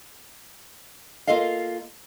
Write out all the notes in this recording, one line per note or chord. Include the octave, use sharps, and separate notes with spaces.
A#3 F4 A4 D#5 F5